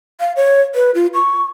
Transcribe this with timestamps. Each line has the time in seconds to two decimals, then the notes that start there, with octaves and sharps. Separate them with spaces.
0.20 F5
0.36 C#5
0.75 B4
0.95 F4
1.14 C#6